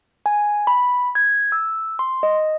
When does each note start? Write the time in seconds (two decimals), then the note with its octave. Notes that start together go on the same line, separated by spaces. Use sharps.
0.26 G#5
0.67 B5
1.15 G#6
1.52 E6
1.99 C6
2.23 D#5